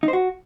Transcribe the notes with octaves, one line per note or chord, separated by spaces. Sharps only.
D#4
C5
F#4